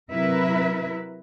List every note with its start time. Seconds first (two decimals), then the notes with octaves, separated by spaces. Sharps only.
0.12 C3 F#3 E4 A#4 B4 E5